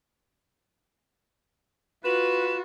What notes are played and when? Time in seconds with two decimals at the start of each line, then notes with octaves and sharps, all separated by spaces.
2.05 F4 F#4 B4 E7